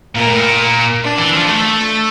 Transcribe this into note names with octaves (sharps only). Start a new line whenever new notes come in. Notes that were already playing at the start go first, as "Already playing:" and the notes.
A#2 A#4
A2
A#2
D4
E3
F3
A3 A4